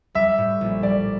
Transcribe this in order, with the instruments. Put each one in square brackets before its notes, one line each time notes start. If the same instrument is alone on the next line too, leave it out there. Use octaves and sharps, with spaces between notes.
[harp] G3 [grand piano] E5
[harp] A2
A#1
[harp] G3 [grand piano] D5